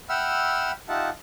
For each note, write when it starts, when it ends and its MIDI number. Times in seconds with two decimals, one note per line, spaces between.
0.09 0.71 76
0.09 0.71 78
0.09 0.71 79
0.09 0.71 83
0.09 0.71 88
0.09 0.71 89
0.89 1.10 63
0.89 1.10 65
0.89 1.10 67
0.89 1.10 76
0.89 1.10 78
0.89 1.10 81